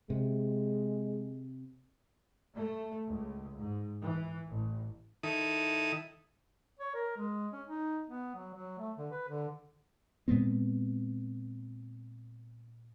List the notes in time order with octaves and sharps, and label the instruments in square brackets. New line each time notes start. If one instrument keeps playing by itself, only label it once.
[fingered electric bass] C3 [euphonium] G#3
[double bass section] A3
C#2
G#2
E3
A1
[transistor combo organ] D#3 E4 A4 D#6
[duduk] C#5
A#4
G#3
C#4
D#4
B3
F#3
F#3
A3
D3
B4
D3
[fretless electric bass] A#2 G#3 B3 C4